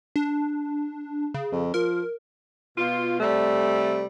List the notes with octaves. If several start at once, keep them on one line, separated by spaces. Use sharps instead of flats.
D4
C#3
F2
F3 A#4
B2 F4
C3 G3 A3